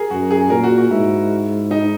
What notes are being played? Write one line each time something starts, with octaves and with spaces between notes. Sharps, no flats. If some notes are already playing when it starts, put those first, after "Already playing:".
Already playing: G#4 A#4
F#2 F#4
G#4
A#2 A#4
F#4
F#4
G#2 E4
D#4